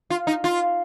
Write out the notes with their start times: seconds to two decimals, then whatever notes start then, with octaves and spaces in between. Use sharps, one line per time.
0.10 F4
0.27 D#4
0.44 F4